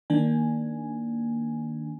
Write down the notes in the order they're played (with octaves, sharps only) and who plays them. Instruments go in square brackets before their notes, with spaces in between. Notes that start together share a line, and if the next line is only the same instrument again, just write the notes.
[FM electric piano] D#3 A#3 D4 G#5